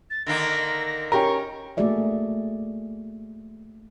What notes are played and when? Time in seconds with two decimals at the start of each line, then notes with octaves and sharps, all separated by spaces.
0.10 A6
0.27 D3 D#3 A#3 A#6
1.12 C#4 G4 A#4 C#6
1.77 A3 A#3 F#4 G#4 D5 E5